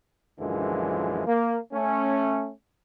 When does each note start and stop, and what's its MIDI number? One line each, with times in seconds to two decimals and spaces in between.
0.39 1.23 34
0.39 1.23 42
0.39 1.23 50
0.39 1.23 52
0.39 1.23 53
0.39 1.23 56
1.27 1.57 58
1.72 2.50 57
1.72 2.50 61